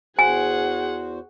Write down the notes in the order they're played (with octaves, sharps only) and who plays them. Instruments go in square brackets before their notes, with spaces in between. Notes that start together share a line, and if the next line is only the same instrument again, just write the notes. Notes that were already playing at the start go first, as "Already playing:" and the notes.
[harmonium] E2 F#4 C5 [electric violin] G#4 F#5 [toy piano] G#5